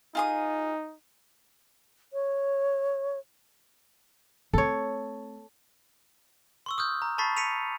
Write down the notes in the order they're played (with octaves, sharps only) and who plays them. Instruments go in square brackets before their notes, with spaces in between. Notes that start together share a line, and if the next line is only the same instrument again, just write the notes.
[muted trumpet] D#4 [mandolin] F4 G#4 D#6
[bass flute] C#5
[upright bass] A3 C4 [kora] A4 C#5
[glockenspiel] C6 C#6 E6
D#6 F6 G6
A#5
A5 B5 C#6 A6 B6 C7
B6 C#7 D#7 F7